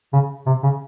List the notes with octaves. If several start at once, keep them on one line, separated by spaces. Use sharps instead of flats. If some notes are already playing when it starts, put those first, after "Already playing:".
C#3
C3
C#3